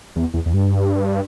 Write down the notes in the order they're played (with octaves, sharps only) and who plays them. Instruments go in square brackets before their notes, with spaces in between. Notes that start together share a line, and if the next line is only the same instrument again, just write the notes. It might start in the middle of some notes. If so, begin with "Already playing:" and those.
[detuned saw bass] E2
E2
E2
G2